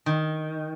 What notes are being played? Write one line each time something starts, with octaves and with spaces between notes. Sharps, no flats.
D#3